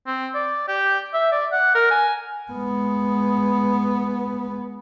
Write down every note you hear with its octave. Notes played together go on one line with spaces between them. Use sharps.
C4
D5
G4
E5
D5
F#5
A#4
G#5
G#3 B3